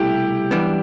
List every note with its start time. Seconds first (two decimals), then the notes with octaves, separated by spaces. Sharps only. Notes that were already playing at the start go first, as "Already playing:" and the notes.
Already playing: C2 B2 A3 E4 G4
0.51 F#2 E3 G3 B3 D4